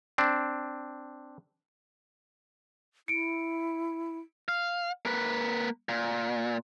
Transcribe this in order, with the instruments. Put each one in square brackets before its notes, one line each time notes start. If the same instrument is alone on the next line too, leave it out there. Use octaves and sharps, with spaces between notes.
[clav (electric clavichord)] C4 D4
[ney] E4 [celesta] C#7 D7
[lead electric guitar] F5
A#3 B4
A#2